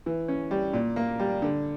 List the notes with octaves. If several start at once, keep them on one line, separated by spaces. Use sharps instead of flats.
E3
C#4
G3
A#2
A#3
G3
D3